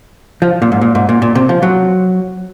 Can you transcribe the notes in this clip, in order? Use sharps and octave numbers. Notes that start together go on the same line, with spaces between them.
F3
A#2
G#2
A#2
G#2
A#2
A#2
C3
F3
F#3